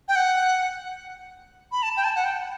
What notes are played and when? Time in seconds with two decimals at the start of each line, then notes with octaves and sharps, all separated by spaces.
0.08 G5
0.16 F#5
1.72 B5
1.83 A5
1.97 G5
2.04 A5
2.16 F#5
2.24 G5